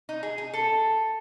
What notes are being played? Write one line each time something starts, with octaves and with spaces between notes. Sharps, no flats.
D#4
G#4
G#4
A4